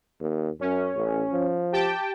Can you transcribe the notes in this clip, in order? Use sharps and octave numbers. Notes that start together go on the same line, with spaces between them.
D#2
F#2 C#4
A1
F3
G4 G5 A5